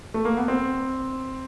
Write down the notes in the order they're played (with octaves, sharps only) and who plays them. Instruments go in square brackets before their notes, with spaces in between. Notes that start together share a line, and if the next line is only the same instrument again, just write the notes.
[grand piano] A3
A#3
B3
C4